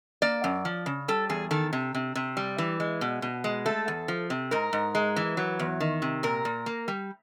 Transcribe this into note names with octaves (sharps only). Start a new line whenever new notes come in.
A#3 D5
F#2
F3
C#3
G3 A4
E2 G#4
D#3 A4
C3
C3
C3
G3
E3
G#3
B2
B2
G#3
A3 A4
E2
F3
C3
G#2 A#4
G#2
G#3
E3
F#3
E2
D#3
C3
A#2 A#4
A#2
A#3
G3